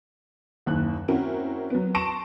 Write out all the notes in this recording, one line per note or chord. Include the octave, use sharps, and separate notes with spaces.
F#1 D#2 F#6
C4 C#4 E4 F#4 A#4
F#3 B3
A5 C6 C#6 A#6 D7 E7